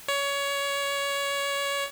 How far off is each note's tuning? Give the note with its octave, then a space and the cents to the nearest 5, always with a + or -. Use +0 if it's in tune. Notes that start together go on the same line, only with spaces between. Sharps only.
C#5 +20